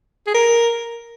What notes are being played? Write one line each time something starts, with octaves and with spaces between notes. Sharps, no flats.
G#4
A#4